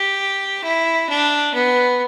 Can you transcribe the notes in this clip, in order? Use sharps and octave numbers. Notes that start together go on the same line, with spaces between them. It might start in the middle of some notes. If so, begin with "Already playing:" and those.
Already playing: G4
E4
D4
B3